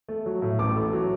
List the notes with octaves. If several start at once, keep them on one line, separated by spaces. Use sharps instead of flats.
A3
F#3
A2
A1 D6
A3
F#3